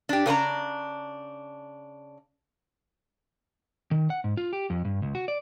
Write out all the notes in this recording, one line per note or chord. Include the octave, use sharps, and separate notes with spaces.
D4 G4
C#3 D4 B4 A#5
D#3
F#5
G#2
F4
G4
F2
G2
C#2
F#4
D5